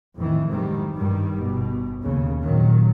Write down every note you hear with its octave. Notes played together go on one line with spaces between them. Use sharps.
F2 A2 D#3 E3
G#2 D#3 G3
G2 D#3 G3
G1 B2
D#2 C#3
F2 A#2 D#3 F#3